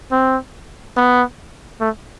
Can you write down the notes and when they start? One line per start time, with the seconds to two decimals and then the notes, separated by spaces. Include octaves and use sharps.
0.12 C4
0.97 B3
1.81 A3